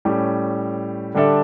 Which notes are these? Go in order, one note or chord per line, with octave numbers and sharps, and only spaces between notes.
A2 G3 C#4
D3 G3 D4 A4 E5